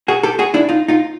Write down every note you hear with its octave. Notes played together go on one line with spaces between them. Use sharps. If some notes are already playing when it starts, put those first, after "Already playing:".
F#4 G#4
G4 A4
F#4 G#4
D4 E4
D#4 F4
D#4 F4